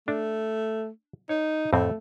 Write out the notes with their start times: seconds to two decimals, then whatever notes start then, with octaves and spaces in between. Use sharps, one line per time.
0.08 A3 D4
1.29 D#4 C#5
1.73 F2 A2 A3 C4